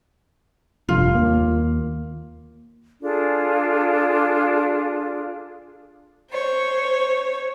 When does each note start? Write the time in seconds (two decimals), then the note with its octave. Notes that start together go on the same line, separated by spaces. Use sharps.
0.89 F1 G2 F4
1.15 D#2 A#3
3.02 D4 F4 G#4 A4
6.31 C5 C#5